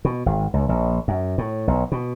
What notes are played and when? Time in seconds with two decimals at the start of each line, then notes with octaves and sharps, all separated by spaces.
0.05 B2
0.26 G#1
0.54 C#2
0.69 A#1
1.08 F#2
1.38 A2
1.68 B1
1.92 B2